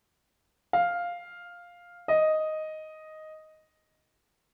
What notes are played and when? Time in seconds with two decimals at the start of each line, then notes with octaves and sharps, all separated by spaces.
0.73 F5
2.08 D#5